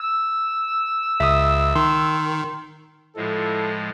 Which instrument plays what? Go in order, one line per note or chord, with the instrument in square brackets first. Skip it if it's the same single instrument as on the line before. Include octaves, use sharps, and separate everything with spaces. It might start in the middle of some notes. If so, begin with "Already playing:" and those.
[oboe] E6
[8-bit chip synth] C#2 [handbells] E5 D#6
[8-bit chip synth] D#3 [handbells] C6
[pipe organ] A2 F3 G#3 [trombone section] E4 F4 A4